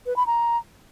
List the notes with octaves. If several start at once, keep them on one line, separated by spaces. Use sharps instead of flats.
B4
B5
A#5